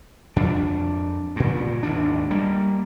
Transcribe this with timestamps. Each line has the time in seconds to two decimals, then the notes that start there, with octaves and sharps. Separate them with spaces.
0.36 F2 D4
1.36 G2 A#2
1.83 G#1 D#2 D4
2.31 G3 A#3